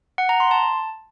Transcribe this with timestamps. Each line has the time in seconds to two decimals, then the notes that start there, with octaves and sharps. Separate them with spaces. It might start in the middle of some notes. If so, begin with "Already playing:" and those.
0.18 F#5
0.29 A#5
0.40 C6
0.51 A5